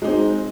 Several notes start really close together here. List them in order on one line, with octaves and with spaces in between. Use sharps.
G#3 D#4 C4